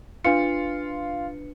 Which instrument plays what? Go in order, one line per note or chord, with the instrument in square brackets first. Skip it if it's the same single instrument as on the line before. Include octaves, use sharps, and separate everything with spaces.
[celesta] D4 B4 C#7 [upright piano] F4